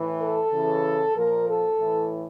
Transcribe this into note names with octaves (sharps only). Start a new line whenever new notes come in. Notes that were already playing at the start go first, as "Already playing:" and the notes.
Already playing: A2 E3
A4
C#3 E3
A#2 F3 A#4
A4
A2 E3